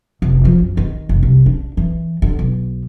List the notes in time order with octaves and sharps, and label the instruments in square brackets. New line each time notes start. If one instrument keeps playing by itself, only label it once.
[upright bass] F1
F3
F#2
D#3
F1
C2
D4
E3
D3
B1